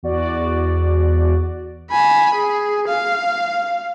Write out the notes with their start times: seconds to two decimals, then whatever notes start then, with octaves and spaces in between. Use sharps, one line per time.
0.03 E2 F#4 D5
1.91 G#5 B5
2.35 G#4
2.88 F5